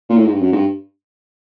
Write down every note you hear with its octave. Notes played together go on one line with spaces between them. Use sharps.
A#2
A2
G#2
G2
F#2
G#2
G2